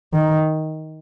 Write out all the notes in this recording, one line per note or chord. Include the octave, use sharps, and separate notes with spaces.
D#3